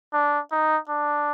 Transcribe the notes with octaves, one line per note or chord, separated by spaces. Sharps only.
D4
D#4
D4